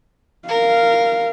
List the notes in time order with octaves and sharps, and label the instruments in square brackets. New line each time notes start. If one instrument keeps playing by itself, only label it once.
[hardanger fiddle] A#4 [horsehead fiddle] F5